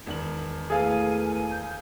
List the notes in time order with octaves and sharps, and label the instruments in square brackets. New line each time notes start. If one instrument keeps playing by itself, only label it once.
[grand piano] E1 D#3 F#7
[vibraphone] A3 E4 B4 [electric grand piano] G#4 A4 F5 [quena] G#5
[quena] G6